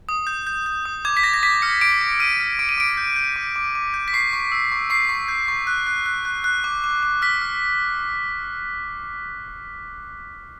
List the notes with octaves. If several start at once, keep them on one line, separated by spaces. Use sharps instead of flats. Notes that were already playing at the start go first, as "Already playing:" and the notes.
D#6
G6
G6
G6
D#6
D6 G#6
B6
D6 A#6
A#6
D6 B6
F6 C#7
D6 D7
D6
F6 D#7
F6
D6 D7
D#7
D6 D7
G6
G6
D6
D6
D6
G6
B6
C#6 C7
C#6
E6
C#6
C#6 C7
C#6
G6
C#6
F#6
F#6
F#6
F#6
F#6
D6
D6
D6
F6 B6
F6